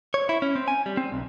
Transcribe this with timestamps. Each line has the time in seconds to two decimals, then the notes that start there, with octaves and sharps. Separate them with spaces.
0.14 C#5
0.29 E4
0.42 C#4
0.56 C4
0.68 G#5
0.86 G3
0.97 C4
1.12 B1